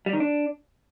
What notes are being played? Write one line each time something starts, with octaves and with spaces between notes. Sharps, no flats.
G3
D#3
D4